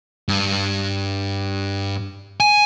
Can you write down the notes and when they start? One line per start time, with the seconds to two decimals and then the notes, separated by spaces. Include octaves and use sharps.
0.29 G2
2.40 G#5